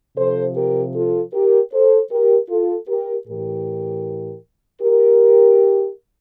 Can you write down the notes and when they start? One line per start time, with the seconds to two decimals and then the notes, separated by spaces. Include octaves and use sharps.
0.17 C3 F3 A4 C5
0.56 G4 A#4
0.94 F4 A4
1.33 G4 A#4
1.73 A4 C5
2.11 G4 A#4
2.49 F4 A4
2.89 G4 A#4
3.27 A2 E3 G4 A#4
4.82 G4 A#4